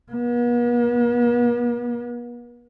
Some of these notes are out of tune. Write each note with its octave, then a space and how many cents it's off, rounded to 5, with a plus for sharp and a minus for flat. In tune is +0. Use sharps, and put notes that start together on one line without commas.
B3 -45